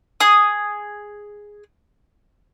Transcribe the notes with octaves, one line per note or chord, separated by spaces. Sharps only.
G#4 D#6